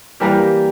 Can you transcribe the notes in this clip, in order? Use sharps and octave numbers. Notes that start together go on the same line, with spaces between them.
E3 G3 A#3 G4 A#4